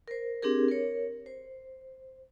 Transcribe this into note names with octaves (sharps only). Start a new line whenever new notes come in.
A#4 C5
C4 D4 G4 G#4 A#4
A#4 C#5
C5